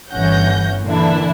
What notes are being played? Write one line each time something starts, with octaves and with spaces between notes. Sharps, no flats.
G1 E3 C#4 F#5 G6 A#6
A#2 D3 E3 D4 E4